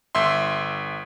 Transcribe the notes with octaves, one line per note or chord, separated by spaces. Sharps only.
G1 E5 C6